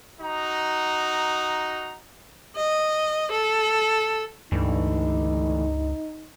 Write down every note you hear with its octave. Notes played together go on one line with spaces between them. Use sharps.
D#4 F#4 A#5
D#5
A4
C#2 G2 D3 E3 A3 D#4